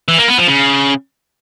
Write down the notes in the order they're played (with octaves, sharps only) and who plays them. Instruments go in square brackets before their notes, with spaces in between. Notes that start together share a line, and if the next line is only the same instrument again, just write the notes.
[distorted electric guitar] E3
A#3
B3
F3
C#3